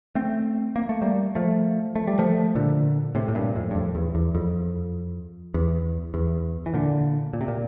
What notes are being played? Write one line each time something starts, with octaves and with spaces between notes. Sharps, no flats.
A3 C4
A#3
A3
G3 A#3
F3 A3
A3
G3
F3 A3
A#2 D3
A2 C3
A2
G2 A#2
F2 A2
G2
F2
E2
E2
F2
E2
E2
E3
A#2 D3
A#2
C3
A#2